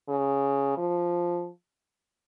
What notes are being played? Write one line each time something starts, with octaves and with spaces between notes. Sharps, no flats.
C#3
F3